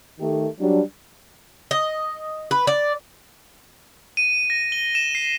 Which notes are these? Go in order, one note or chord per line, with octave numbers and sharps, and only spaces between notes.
D#3 A3 G4
F#3 G3 D4
D#5
B4
D5
D#7
A#6
G7
E7
C7